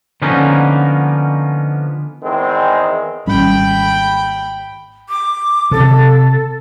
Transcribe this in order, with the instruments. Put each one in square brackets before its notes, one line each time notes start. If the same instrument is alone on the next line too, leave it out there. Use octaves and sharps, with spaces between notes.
[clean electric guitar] D3 F3 A#3 B3 C#4 D#4
[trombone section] E2 D#3 G#3 C4
[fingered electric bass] G#1 G3 C#4 [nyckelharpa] G5 B5
[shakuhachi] D6
[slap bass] C3 [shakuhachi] A4